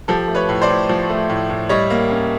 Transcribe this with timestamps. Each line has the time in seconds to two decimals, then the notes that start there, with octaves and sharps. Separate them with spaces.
0.08 F3 G4 A4
0.28 A3
0.35 B4 C#5
0.49 A2
0.62 C5 D5
0.68 A2
0.89 F3
1.10 A3
1.29 A2
1.50 A2
1.69 G3 C#5 D#5
1.90 A#3
2.11 C#4